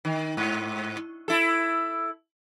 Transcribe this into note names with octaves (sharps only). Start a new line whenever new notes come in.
D#3
G#2
E4 A4